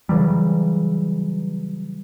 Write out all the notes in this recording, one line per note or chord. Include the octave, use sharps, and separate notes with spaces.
C#3 E3 F#3 G3